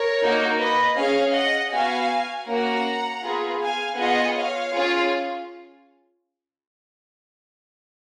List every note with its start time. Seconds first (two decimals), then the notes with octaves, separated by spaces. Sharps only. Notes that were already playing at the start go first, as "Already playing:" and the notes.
Already playing: A#4 C#5
0.20 A#3 D#4 F#4
0.58 B4 D#5
0.96 C#4 G#4 C#5 F5
1.33 D#5 F#5
1.71 B3 F#4 F5 G#5
2.46 A#3 C#4 F#4 F#5 A#5
3.22 B3 F4 G#4
3.60 F5 G#5
3.97 B3 F4 G#4 D#5 F#5
4.35 C#5 F5
4.74 C#4 F4 G#4